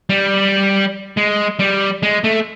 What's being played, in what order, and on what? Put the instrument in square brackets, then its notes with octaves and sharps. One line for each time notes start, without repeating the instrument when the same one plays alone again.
[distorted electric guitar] G3
G#3
G3
G#3
A3